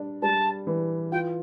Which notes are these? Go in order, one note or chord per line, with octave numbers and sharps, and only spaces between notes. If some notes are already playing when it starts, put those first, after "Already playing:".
Already playing: G3 D4
G3 A5
E3
F4 G5